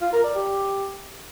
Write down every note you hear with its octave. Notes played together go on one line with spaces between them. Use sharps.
F4
A#4
D5
G4